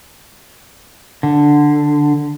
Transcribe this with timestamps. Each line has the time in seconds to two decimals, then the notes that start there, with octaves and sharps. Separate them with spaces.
1.23 D3